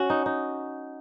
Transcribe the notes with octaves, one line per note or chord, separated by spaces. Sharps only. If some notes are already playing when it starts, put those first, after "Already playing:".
Already playing: C#4 F#4
D#4
D#4